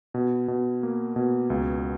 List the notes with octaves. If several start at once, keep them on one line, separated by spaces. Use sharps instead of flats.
B2
B2
A#3
B2
C#2